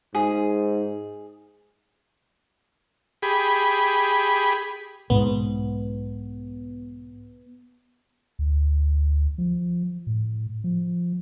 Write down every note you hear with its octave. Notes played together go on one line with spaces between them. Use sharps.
G#2 G#4
G4 G#4 B5
B1 G#2 B2 B3
D2
F3
A2
F3